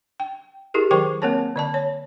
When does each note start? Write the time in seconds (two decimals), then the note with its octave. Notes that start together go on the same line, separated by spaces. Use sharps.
0.20 G5
0.74 E4 G4 G#4 A#4
0.91 D#3 F#3 A#4 C5 G5 C#6
1.22 A#3 C4 A#4 C#5 A5
1.56 D3 D5 A5
1.74 C#5